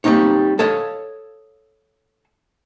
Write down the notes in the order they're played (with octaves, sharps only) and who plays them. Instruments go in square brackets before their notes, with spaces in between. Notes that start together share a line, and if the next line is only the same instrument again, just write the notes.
[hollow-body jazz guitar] G3 A#3 C4 D#4 C#5
A4 C#5 D#5 F5